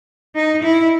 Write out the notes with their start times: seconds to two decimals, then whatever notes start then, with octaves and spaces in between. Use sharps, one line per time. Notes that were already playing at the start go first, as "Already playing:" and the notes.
0.35 D#4
0.63 E4